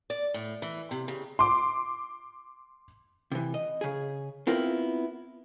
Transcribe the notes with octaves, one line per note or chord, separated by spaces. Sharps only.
D5
A2
E3
C3
C#3
C6 D6
C3 E3
D#5
C#3 G#4
B3 C4 E4 F4 A#4